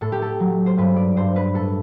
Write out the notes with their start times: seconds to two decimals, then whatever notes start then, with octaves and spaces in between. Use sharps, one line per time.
0.01 A2 A4
0.12 G4
0.22 A4
0.40 F#3
0.66 C5
0.77 G2 B4
0.96 D5
1.16 G2 C5
1.36 B4
1.54 A2 A4